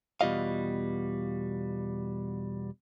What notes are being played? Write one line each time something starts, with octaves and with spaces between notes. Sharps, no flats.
E2 B2 G3 F4 D#5 F5